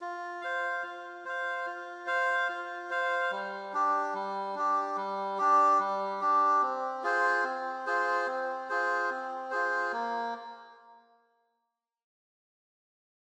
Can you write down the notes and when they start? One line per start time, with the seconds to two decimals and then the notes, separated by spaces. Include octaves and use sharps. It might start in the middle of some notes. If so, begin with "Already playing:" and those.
0.01 F4
0.41 C5 F5
0.83 F4
1.25 C5 F5
1.66 F4
2.07 C5 F5
2.49 F4
2.90 C5 F5
3.31 G3
3.73 D4 G4
4.14 G3
4.55 D4 G4
4.97 G3
5.38 D4 G4
5.79 G3
6.21 D4 G4
6.62 C4
7.03 F4 G#4 C5
7.44 C4
7.86 F4 G#4 C5
8.27 C4
8.69 F4 G#4 C5
9.10 C4
9.51 F4 G#4 C5
9.93 A#3